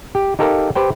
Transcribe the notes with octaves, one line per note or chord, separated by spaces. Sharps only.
G4
D#4 G4 A4 A#4 F5
G4 B4 C5 G5